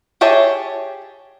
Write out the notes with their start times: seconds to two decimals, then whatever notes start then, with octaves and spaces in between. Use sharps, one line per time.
0.21 G4 G#4 C#5 E5 A5